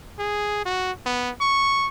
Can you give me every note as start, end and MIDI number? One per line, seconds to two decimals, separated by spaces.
0.19 0.63 68
0.66 0.92 66
1.06 1.31 59
1.41 1.88 85